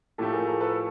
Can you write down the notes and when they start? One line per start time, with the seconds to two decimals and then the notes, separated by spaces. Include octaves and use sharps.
0.18 A2 F3 A3 G4 A4
0.32 G#4 A#4
0.47 G#4 A#4
0.60 A4 B4